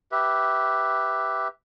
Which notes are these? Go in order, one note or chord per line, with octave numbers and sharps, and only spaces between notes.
G4 B4 E5